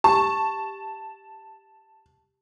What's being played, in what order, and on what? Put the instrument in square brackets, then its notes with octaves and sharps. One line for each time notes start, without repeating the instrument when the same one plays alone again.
[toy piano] G4 [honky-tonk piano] A5